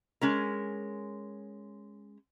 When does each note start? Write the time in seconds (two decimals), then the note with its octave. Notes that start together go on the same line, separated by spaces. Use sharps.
0.21 G#3 C#4 A#4